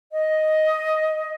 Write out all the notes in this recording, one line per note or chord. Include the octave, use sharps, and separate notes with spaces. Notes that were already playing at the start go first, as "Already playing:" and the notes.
D#5